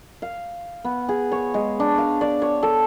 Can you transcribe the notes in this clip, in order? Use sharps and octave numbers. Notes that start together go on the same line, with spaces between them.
F5
B3
G#4
C#5
G#3
D4
F5
D5
C#5
A4